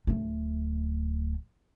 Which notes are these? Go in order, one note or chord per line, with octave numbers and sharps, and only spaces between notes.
D1 A3